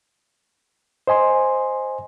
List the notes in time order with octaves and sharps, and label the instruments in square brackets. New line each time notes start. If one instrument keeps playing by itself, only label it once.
[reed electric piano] C5 D#5 G#5 C6